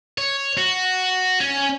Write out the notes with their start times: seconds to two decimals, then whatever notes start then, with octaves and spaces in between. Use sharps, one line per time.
0.18 C#5
0.58 F#4
1.40 C#4